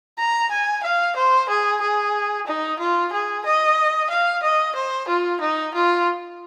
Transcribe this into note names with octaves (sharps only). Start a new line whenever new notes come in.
A#5
G#5
F5
C5
G#4
G#4
D#4
F4
G#4
D#5
F5
D#5
C5
F4
D#4
F4